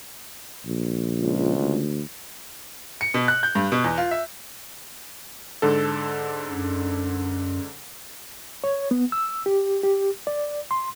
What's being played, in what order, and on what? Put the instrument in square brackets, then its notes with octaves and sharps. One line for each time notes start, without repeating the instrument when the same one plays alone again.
[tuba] A#1
[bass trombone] C#2
[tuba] D2
[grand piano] C#7
B2
F#6
G6
G2
B2
E2
F4
E5
[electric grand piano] G#2 D3 A4
[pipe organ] F#2
[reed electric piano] C#5
B3
E6
G4
G4
D5
C6